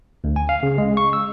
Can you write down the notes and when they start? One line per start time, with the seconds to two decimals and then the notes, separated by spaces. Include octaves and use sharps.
0.24 D2
0.36 G#5
0.49 F5
0.63 C#3
0.78 G#3
0.97 C#6
1.13 E6